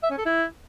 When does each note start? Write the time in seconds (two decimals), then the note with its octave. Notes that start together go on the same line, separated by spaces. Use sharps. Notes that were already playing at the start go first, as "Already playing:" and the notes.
0.03 E5
0.10 C#4
0.18 A4
0.25 E4